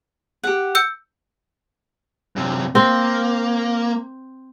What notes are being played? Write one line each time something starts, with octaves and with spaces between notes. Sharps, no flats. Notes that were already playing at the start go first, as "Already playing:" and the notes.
G4 F#5
E6 G6 C#7
F#2 C3
A#3 C4